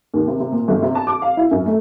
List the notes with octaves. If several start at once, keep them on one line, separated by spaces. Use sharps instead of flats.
D#2
C3
C3
A#2
G1
C3
A5
D6
F5
E4
F#2
A3